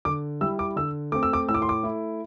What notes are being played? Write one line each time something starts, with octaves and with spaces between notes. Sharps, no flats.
D3 D6
G3 E4 E6
D6
D3 E6
A3 C4 D6
E6
D6
A2 E6
D6
C6
D6
A3 E4